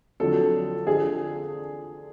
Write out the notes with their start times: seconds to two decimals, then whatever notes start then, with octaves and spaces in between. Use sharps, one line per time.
0.20 F2 D3 F#3 A4
0.87 D3 F3 G#4